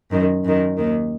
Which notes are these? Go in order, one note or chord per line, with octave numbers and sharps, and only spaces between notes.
F#2 D#3
F#2 D#3
D#2 D#3